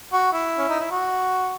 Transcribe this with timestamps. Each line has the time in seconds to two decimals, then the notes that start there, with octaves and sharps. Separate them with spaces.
0.13 F#4
0.33 E4
0.58 C#4
0.69 D#4
0.80 E4
0.91 F#4